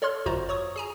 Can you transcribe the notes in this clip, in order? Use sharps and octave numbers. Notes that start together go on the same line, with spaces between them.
A4 C#5 D5 C6 F6
G1 F#2 F4 F#4 C5 A#5
C#5 C#6 D#6
G#4 G#5 A#5